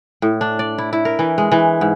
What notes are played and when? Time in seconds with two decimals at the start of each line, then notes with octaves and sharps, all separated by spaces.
0.22 A2
0.41 D4
0.59 D5
0.78 E4
0.93 E4
1.05 A#4
1.19 E3
1.38 G#3
1.52 E3
1.81 G#2